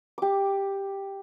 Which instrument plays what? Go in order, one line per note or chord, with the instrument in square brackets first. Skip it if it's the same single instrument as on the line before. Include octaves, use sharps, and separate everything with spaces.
[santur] G4 D6